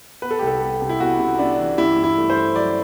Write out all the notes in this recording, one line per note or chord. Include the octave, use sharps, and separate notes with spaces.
B3 B4
A4
C2 G4
A4
B3
C3
E4
B3 F#4
C3
B3 D4
E3
G2 E4
G2
E4
A3
C5
A3
F#3 D5